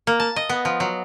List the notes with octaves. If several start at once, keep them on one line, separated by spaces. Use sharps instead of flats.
A#3
A5
D#5
B3
F3
F#3